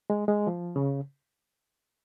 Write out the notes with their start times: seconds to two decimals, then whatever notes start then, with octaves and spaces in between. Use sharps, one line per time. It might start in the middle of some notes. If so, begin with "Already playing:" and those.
0.10 G#3
0.28 G#3
0.47 F3
0.76 C#3